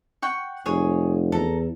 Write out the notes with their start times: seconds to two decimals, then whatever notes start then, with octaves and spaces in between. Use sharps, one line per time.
0.22 F#5 G5 C#6
0.66 F1 G#4 C#5
1.32 E2 A4 A#5